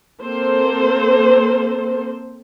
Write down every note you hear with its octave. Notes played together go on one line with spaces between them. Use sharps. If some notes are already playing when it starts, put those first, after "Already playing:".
A#3 C4 A4 C5